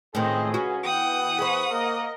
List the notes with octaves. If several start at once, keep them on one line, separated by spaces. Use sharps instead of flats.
C#2 A2 D#3 C4 G#4 D#5
C#4 F#4 B4
E3 B3 F#5 G5 D#6
G#4 C5 B5 C#6
A#3 A#4 D#5